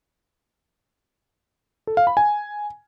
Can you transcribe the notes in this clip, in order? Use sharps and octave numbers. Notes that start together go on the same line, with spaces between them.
A4
F5
B5
G#5